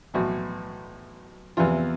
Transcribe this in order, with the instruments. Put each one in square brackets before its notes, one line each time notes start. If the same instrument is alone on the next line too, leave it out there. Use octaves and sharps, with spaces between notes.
[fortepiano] B1 A2 E3 F#4
E2 C3 E3 F4